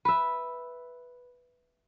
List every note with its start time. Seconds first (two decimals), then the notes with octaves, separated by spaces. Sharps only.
0.05 B4 E5